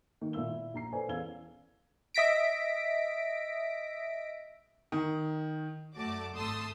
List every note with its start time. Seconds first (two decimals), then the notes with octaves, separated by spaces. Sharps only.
0.21 D#3 A#3
0.33 A#2 A#3 E4 F5 E6 G7
0.50 E4
0.74 A#1 A#5 C7
0.92 A4 B4 C5 D5 G#5
1.08 E2 C#4 F5 E6 G#6 G7
2.14 D#5 E5 A#6 B6 D7
4.92 D#3
5.95 F#2 A3 F#4 D5 A5 D6
6.35 G#1 A3 A5 C6 D#6 E6